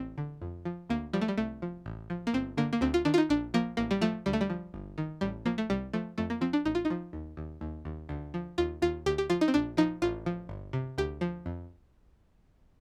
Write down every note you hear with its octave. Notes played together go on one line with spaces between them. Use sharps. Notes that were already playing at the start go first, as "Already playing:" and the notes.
Already playing: A1 C4
D3
F2
F3
D2 A#3
F3 G3
A3
G3
C2 A3
F3
A1
F3
A#3
G1 C4
D3 A#3
A#3
D2 C4
F4
D#3 D4
F4
D#4
A#1 D4
F3 A#3
A1 A#3
G3
F3 A3
D2 G3
A3
G3
F3
G1
D#3
A1 G3
F3 A#3
A3
C2 G3
F3 A3
F2 A3
A#3
F3 C4
D4
A1 D#4
F4
D#4
F3
D#2
D#2
D#2
D#2
D2
F3
D#2 F4
D#2 F4
D2 G4
G4
F3 F4
D#4
C4
A#1 D4
F3 D#4
A1 F4
F3
G1
C3
D2 G4
F3
F2